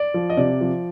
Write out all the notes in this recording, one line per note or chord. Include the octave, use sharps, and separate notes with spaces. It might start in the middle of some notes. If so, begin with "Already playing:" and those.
Already playing: D5
F3
D#5
C3 D5
F3